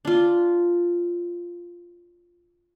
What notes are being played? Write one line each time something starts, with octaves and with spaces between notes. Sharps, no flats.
D4 F4